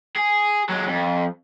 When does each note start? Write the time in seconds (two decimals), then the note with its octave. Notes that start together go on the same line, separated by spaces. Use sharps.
0.16 G#4
0.69 F#3 G#3
0.88 F2